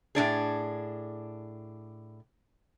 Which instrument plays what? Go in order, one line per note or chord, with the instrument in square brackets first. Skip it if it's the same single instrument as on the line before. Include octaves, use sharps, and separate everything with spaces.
[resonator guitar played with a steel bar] A2 E3 D4 G#4